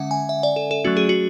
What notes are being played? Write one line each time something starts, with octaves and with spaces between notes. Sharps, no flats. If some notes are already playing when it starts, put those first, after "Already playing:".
Already playing: D3 G#3 C#4 E5 F#5
G#5
E5
D5
A4
A4
F#3 A3 C#4 F#4
G#4
F#4